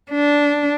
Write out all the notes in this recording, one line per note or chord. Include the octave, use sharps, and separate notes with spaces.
D4